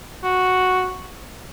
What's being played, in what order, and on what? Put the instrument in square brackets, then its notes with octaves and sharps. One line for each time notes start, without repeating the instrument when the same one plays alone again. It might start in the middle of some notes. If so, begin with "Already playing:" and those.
[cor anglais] F#4